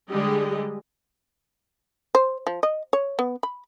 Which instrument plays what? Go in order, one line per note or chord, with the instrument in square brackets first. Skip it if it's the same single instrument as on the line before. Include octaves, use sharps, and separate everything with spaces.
[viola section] D3 G3 G#3 G4 G#4 D#5
[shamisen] C5
F3
D#5
C#5
B3
B5